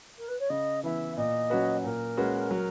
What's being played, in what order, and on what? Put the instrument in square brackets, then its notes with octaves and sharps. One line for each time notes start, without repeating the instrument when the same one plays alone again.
[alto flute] A#4
B4
C#5
[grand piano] C#3 [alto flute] D#5
[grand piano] E3 B3 E4 [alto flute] E5
[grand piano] A#2 [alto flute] D#5
[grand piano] F#3 C#4 F#4 B4
[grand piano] A#2 [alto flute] A#4
[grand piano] G#3 C#4 F#4 B4
F#3